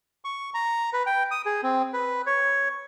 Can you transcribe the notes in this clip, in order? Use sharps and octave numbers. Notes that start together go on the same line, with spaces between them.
C#6
A#5
B4
G5
D#6
G#4
C4
B4
C#5